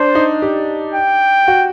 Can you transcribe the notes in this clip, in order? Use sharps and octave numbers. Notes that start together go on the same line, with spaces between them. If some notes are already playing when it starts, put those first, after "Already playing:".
Already playing: D4 C5
D#4
G4
G5
F#4